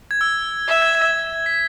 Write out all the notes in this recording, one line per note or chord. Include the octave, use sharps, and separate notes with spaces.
G#6
E6
E5
G#6
G#6
B6